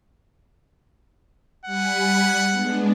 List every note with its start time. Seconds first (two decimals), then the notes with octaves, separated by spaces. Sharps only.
1.65 G3 F#5 G#5 B5
2.49 G#3 B3 D4